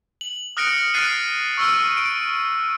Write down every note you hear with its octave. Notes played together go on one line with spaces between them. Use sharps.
F#7
D#6 F6 F#6 A#6 C#7 D7
F6 F#6 A6 C7 D7 D#7
C#6 E6 F6
D7